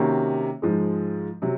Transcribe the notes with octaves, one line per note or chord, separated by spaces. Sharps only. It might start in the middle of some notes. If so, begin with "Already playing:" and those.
Already playing: C3 D#3 A#3 C#4 F#4
G#2 F3 G#3
C3 F#3